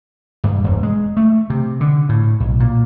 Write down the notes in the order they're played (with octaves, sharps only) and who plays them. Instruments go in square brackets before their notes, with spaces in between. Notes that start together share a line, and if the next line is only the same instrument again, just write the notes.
[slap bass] G2
E1
G#3
A3
C3
D3
A2
B1
A#2